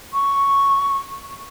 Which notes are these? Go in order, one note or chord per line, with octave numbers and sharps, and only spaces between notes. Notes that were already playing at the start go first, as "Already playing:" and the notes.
C#6